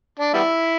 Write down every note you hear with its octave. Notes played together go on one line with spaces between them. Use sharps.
D4
G3 B3 E4